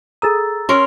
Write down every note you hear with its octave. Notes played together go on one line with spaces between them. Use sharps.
G#4 A4 A#5 D#6 E6 A6
C#4 A#4 C6